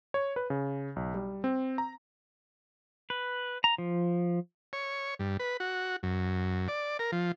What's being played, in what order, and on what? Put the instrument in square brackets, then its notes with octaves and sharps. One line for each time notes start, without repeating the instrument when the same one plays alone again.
[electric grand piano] C#5
B4
C#3
B1
G3
C4
A#5
[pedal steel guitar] B4
A#5
F3
[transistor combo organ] C#5
G2
B4
F#4
F#2
D5
A#4
F3